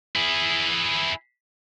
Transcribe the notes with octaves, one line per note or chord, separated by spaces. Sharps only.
E4 G#4